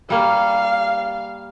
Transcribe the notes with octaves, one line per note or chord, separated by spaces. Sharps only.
G3 A#3 F5